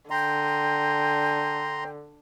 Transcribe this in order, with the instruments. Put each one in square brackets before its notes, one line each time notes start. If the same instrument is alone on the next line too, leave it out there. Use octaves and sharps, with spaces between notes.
[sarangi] D3 [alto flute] G5 [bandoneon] A#5 C6